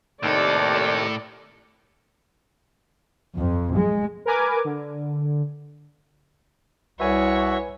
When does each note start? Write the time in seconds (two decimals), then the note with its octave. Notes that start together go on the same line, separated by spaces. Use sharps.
0.23 D#2 A2 C3 D#3 A4 D5
3.36 F2
3.75 G#3
4.26 A#4 B4 G#5 D6
4.65 D3
7.00 C2 F#4 B4 C#5 E5 G#5